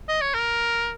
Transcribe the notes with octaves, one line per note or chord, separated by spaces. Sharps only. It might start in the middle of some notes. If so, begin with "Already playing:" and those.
D#5
C#5
A#4